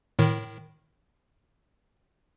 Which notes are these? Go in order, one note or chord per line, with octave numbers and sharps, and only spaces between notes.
A2 D#3